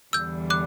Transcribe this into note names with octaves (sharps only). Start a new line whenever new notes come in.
E2 D3 G3 E6 G6
D6 F#6